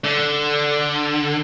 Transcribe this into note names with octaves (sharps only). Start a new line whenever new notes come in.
D3